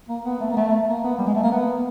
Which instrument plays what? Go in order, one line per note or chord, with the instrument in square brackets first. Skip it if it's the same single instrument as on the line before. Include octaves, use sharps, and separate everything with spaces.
[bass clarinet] A#3
B3
A3
A#3
A3
A#3
B3
G3
G#3
A3
A#3
B3